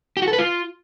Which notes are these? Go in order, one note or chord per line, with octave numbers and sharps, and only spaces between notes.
G4
F#4
A4
B4
F4